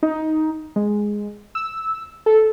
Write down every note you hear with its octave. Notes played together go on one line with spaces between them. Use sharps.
D#4
G#3
E6
A4